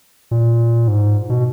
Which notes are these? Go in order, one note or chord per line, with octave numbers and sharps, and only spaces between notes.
A#2
G#2
B2